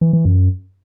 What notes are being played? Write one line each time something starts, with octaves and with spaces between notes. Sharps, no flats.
E3
E3
F#2